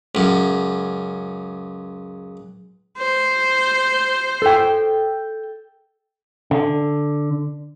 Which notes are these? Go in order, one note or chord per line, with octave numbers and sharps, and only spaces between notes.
C#2 F#2
C5
A4 G5
D3